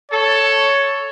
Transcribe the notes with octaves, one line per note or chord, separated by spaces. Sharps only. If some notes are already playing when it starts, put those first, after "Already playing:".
A4 C#5